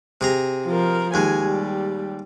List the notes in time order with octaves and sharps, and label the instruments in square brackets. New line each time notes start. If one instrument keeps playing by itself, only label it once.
[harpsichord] C3 G#4 A#5
[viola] F3 A#4
[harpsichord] D#2 G#3 [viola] G#5
[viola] G3